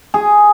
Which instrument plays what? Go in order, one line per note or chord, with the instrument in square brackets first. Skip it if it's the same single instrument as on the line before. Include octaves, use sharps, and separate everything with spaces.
[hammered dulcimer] G#4